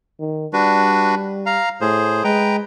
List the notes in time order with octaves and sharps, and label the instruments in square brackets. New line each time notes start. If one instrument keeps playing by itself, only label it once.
[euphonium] D#3
[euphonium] G3 [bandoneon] D4 F#4 B4
[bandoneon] F5 A#5
[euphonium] A2 [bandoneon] G#4 C5
[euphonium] G#3 [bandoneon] B4 G5 A#5